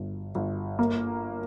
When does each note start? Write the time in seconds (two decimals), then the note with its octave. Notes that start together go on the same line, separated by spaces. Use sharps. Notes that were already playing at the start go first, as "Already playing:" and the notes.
Already playing: G1
0.35 G1
0.79 A#3